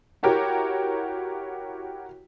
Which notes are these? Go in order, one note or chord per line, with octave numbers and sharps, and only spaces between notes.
E4 F#4 G4 A#4 C#5